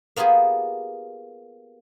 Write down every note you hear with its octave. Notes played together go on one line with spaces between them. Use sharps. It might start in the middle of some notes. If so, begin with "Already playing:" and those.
A#3 B3 F4 G4 G#4